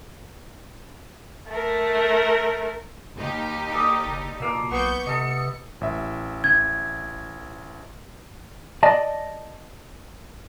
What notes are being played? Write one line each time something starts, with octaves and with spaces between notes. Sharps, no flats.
A3 A#4
D#2 D#4 G4
G3 A4 D#6
F#1
B2 F3 A#3 E6
B1 B3 C#6 G6
C3 A4 D#5 C#7
A1 E5
G#6
D5 D#5 A5